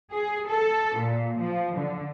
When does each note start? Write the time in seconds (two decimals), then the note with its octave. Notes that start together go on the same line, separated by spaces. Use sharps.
0.13 G#4
0.48 A4
0.97 A#2
1.38 F3
1.76 D3